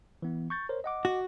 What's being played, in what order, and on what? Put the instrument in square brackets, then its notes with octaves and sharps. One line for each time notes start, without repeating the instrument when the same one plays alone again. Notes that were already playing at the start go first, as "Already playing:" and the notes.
[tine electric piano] E3 B3
C#6 G6 A6
A#4 C5 C#5
D#5 F#5 D6
[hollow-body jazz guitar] F#4